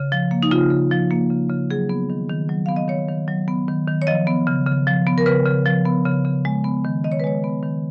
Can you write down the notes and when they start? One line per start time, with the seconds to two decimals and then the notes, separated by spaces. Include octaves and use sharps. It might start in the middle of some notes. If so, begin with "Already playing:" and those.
Already playing: C#3
0.12 F3
0.31 A#3
0.43 D#4
0.51 C#3 F4
0.70 C#3
0.91 F3
1.11 A#3
1.30 C#3
1.50 C#3
1.71 F#3 G#4
1.89 B3
2.10 D#3
2.30 D#3
2.49 F#3
2.66 B3 F5
2.76 D#5
2.88 D#3 C#5
3.08 D#3
3.28 F#3
3.48 B3
3.68 D#3
3.88 D#3
4.02 C#5
4.07 F3 D#5
4.27 B3
4.47 C#3
4.67 C#3
4.87 F3
5.07 B3
5.18 A#4
5.26 C#3 B4
5.46 C#3
5.66 F3
5.86 B3
6.05 C#3
6.25 C#3
6.45 G#3
6.64 B3
6.85 D#3
7.04 D#3 D#5
7.12 C#5
7.20 B4
7.24 G#3 C#5
7.44 B3
7.63 D#3